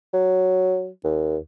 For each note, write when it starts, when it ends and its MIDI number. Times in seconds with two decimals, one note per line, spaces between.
0.13 0.88 54
1.04 1.37 39